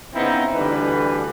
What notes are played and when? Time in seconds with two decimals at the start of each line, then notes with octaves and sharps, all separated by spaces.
0.13 C#3 B3 C4 D#4 E4
0.55 D2 D3 E3 G3 B4